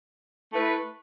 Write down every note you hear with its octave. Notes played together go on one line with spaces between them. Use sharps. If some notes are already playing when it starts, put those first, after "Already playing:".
A3 E4 B4